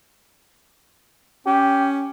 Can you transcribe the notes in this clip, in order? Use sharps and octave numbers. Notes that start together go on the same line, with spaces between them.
C#4 G4